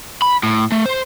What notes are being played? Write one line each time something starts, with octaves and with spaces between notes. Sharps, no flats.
B5
A2
A3
C5